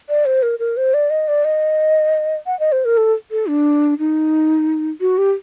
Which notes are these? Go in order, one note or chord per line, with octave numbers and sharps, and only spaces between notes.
D5
C5
A#4
A#4
C5
D5
D#5
D5
D#5
F#5
D#5
C5
A#4
A4
A4
D4
D#4
F#4
G4